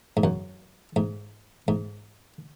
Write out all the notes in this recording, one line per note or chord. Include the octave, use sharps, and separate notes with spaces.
G#2
F#2
G#2
G#2